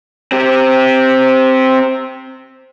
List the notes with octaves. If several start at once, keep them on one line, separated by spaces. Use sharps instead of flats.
C4 G4